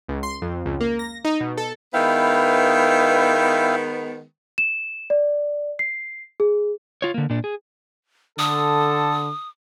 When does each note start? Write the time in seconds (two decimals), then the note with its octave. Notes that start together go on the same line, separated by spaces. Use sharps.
0.08 C#2
0.23 C6
0.42 F2
0.66 C#2
0.81 A#3
0.99 A#6
1.25 D#4
1.40 B2
1.57 A4
1.94 D#3 G#3 B3 E4 F5 G5
4.58 E7
5.10 D5
5.79 C7
6.40 G#4
7.02 F4 C#5
7.14 D3 A#3
7.30 A#2 D4
7.44 G#4
8.39 D3 A4 D#6